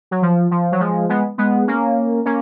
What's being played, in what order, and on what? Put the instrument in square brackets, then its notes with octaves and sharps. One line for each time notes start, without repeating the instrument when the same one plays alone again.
[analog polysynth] F#3
F3
F3
F#3
F3 G#3
G#3 B3
G#3 B3
A#3 C#4
A#3 C#4